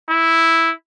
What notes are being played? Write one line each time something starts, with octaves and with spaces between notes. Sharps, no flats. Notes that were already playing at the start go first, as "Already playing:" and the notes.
E4